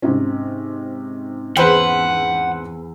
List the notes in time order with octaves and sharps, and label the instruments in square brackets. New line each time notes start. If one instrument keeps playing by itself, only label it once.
[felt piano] G#2 C3 C#4
[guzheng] E2 [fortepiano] B4 C5 G5 [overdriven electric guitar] F#5